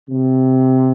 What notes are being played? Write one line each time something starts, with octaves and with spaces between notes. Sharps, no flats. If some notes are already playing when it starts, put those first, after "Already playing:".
C3